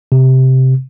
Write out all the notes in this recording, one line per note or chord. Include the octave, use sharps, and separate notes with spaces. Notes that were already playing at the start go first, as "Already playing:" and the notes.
C3